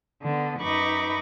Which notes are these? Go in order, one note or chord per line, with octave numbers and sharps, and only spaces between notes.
D3 B3
F#2 D#4 B4 B5 C#6 D6